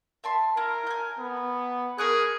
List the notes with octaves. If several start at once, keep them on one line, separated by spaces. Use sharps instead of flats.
E5 A5 C6
E4 A#4
G#5 G6
B3
G#4 A#4 C#6 F#6